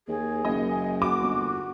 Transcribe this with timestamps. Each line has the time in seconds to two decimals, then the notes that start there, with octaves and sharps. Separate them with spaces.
0.08 D#2 G#4
0.45 F#1 A#3 D#5
0.70 G#5
1.02 F#4 D6
1.21 G1